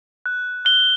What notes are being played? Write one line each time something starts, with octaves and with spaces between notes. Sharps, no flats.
F#6
F#6 G7